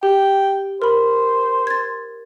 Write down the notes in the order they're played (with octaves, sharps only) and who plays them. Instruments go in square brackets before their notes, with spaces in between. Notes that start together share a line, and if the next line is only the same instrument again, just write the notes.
[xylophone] G4 [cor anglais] G5
[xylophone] A#4 B5 [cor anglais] C5
[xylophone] G#6 A6